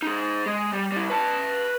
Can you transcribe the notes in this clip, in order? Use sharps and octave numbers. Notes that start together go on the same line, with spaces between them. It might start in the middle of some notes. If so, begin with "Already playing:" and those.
D#4 G#4
G#3
G3
G3 E4
B4 A5